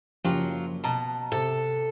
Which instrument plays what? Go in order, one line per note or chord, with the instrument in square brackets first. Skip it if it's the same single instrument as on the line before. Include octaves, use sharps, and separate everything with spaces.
[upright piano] F#1 C#4 G4 [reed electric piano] F3 [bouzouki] F#3 F4
[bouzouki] B2 [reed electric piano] A5 [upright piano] A#5
[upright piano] C3 [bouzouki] A4